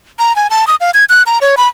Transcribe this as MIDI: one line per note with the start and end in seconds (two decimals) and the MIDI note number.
0.19 0.35 82
0.36 0.47 80
0.50 0.67 81
0.67 0.76 87
0.81 0.91 77
0.94 1.04 92
1.09 1.23 90
1.26 1.38 82
1.41 1.55 73
1.57 1.68 83